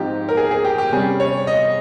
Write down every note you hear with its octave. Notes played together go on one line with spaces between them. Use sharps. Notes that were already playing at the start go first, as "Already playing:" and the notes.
Already playing: G#2 F3 C4 D#4 G4
A#4
G#4
G#4
G4
G4
C3 G3 C#4 G#4
C#5
D#5